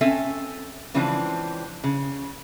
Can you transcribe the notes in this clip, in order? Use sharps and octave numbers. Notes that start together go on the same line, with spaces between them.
C4 C#4 A4 E5 G#5
C#3 E3 F3 G#3 C4 D4
C#3